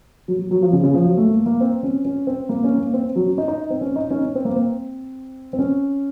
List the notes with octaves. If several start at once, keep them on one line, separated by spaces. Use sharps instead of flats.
F#3
F#3
F#3
F3
C#3
C#3
F3
F#3
A3
A#3
A#3
C4
C#4
C#4
C4
A#3
C#4
A#3
C4
F#3
C#4
D#4
D#4
C4
C#4
D#4
C#4
C#4
C4
A#3
C4
C4
C#4